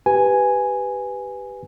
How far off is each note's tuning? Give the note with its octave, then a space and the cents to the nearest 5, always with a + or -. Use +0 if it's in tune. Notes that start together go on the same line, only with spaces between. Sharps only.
G4 +0 B4 +5 G#5 +0